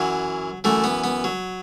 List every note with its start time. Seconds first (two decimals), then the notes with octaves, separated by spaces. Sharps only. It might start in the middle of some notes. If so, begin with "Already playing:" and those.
Already playing: F#2 E3 F#3
0.64 F#2 E3 A3
0.84 B3
1.04 B3
1.24 F#3